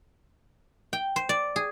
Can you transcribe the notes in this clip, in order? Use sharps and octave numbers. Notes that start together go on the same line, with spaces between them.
G5
C5
D5
G#4